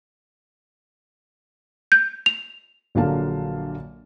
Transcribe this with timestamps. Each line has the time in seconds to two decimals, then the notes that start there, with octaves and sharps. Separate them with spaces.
1.92 G6
2.26 F7
2.95 A#1 D3 F#3 A#3 F5 A5